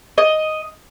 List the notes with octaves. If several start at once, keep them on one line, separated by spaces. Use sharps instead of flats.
D#5